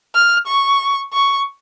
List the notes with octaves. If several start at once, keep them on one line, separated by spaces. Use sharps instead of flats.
F6
C#6
C#6